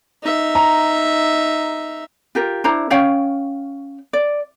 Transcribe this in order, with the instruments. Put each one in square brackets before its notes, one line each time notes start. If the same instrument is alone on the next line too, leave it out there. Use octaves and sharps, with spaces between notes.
[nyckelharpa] D#4 E5
[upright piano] A#5
[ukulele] F4 G4 A#4
D4 E4 C5 A#5
C#4 C#5 F5 G5
D5